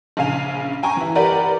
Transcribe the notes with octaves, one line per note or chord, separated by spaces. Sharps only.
A#1 C#3 F5 G#5 F7
G5 G#5 A#5 C#6
E3 E4
G4 A#4 B4 D5 F#5